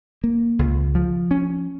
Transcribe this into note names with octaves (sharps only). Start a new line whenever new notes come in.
A#3
C#2
F3
C#4